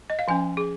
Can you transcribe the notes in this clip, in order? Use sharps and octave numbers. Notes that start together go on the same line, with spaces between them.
D#5
F5
F3 C#4 G#5
G#4